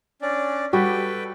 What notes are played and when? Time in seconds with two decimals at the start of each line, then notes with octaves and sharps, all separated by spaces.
0.21 C#4 D4 D5
0.73 G3 F#4 A4 B4 G5